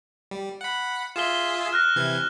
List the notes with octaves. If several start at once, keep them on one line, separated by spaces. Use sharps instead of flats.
G3
F#5 B5
F4 G#4 E5 E7 G7
F6 F#6 A#6
C3 E3 G#6